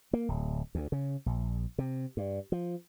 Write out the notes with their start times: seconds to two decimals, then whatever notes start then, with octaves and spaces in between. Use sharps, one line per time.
0.13 A#3
0.29 D1
0.75 D2
0.92 C#3
1.26 A#1
1.78 C3
2.17 G2
2.52 F3